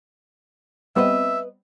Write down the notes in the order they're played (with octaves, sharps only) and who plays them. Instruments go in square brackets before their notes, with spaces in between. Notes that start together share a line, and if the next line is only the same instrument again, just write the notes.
[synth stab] G3 B3 C4 [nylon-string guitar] B4 D#5 [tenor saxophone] E5